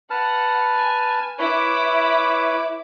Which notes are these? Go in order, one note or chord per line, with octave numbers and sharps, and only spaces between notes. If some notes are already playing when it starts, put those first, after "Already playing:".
B4 F#5 A5 F6
G#5
E4 B4 C#5 D6